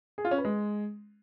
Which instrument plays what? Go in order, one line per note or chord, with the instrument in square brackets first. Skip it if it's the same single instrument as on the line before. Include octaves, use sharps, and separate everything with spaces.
[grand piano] G#4
F4
C#4
B4
G#3